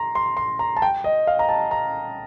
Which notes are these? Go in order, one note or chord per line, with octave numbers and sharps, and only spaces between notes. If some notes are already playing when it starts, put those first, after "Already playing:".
Already playing: A#5 C6
C6
C6
A#5
A5
G5
D#5
F5
A#5
A5
A#5